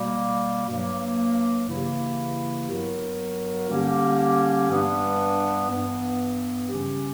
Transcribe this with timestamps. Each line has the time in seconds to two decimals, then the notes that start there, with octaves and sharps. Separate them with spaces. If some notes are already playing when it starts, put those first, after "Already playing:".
Already playing: B2 G3 A#3
0.68 G2 F#3 A#3
1.68 C#3 E3 A#3 E4 G4
2.68 G2 F#3 B3 F#4 A#4
3.68 D3 G3 A#3 C#4 G4
4.69 G2 E3 G3 B3 D4
5.70 G2 E3 B3
6.69 C#3 G3 C#4 G4